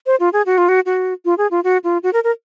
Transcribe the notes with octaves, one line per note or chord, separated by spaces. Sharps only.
C5
F4
G#4
F#4
F4
F#4
F#4
F4
G#4
F4
F#4
F4
F#4
A#4
A#4